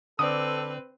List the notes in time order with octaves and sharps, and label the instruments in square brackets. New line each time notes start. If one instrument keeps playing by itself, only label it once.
[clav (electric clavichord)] D3 D5 [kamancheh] C4 B4 [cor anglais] A4 [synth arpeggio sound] D#6